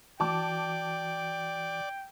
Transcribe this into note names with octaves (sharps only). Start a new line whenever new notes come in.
E3 F#4 D5 G5 A5 D6